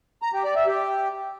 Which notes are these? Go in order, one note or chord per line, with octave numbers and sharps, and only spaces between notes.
A#5
G4
D5
E5
G4